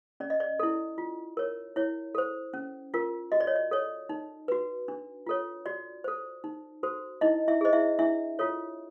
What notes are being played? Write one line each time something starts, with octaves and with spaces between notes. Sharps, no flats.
C#4 D5
D#5
D5
E4 A4
F4
A#4 C#5
E4 C#5
A4 C5
C#4
F4 A#4
F#4 D#5
D5
C#5
D5
A4 C#5
D#4
F#4 B4
D4
F4 A4 C#5
F#4 D5
A4 C5
D#4
F#4 A4 C5
D#4 E4 D#5
E4 E5
G#4 C5 D#5
E4 E5
D4 E4 E5
F4 A4 C#5